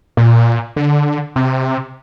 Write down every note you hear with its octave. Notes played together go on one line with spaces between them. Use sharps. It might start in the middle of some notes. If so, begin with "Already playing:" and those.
A#2
D3
C3